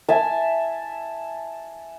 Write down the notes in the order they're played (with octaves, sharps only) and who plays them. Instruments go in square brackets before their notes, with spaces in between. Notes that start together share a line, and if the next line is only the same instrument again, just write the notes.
[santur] E5 G#5 A5